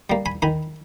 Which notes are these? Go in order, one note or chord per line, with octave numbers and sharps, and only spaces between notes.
G3 A#3
G#5 B5
D#3 G#5 B5